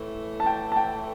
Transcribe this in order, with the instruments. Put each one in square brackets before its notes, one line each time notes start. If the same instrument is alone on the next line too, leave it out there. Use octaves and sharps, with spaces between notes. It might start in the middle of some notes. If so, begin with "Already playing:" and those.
Already playing: [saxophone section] A2 E3 A3
[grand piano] A5
G5
A5
G5